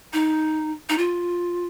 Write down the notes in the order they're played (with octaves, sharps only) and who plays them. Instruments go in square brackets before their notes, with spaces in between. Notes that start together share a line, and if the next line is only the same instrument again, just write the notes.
[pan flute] D#4
D#4
F4